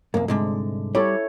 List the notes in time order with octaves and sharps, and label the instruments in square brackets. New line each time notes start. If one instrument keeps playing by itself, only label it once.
[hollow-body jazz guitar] C2 F#2 [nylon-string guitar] A#3
[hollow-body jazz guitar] C2 G#2 D3 [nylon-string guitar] G#3
[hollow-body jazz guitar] G3 [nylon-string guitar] E4 A4 [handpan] C#5